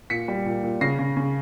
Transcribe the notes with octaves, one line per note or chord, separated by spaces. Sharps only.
A#2 B6 C#7
G3
A#2
A#2
C#3 A#6 C7
C#3
C#3